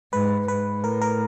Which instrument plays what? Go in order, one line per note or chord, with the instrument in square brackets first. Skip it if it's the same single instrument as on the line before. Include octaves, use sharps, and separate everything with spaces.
[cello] G#2 [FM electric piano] B4
[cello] G#2 [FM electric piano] B4
[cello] A2 [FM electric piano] A#4
[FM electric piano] A#4